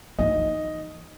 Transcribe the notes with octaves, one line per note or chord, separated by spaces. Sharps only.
E3 D#4 D#5